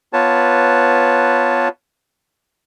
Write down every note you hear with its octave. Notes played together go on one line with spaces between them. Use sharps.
B3 F4 B4 C#5 A5